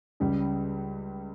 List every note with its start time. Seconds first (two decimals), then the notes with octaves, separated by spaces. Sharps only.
0.20 C#2 C#3 G3